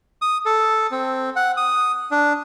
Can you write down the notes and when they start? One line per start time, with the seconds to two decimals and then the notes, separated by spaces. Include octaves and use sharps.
0.22 D#6
0.46 A4
0.91 C4
1.36 F#5
1.57 D#6
2.11 D4